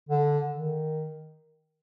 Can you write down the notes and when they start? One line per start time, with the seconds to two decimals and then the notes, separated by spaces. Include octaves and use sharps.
0.09 D3
0.52 D#3